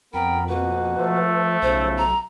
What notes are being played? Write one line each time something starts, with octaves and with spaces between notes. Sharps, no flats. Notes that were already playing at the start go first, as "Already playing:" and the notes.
F2 B3 A#4 G5 B5
B2 A#3 F#4 B4
F3 A3
B1 C#3 F3 C5
A#5